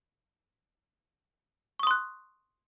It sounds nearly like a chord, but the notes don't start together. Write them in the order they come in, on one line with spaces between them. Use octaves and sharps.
C#6 D#6 C6 F#6